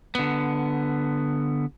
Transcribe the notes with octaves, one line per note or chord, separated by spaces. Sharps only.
D3 B3